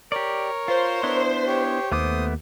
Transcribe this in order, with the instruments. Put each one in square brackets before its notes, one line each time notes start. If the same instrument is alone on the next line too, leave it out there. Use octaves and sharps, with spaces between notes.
[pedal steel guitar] G4 D5 [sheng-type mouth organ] A#4 C#5
[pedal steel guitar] F4 [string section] C5
[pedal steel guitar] B3 D4 E4
[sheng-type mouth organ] G4 C#5
[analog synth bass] D#2 [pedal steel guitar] A3 B3 D6 [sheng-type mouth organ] C5 D#6